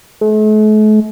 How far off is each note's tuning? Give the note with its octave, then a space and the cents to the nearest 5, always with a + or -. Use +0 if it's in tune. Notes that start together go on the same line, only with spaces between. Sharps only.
A3 -45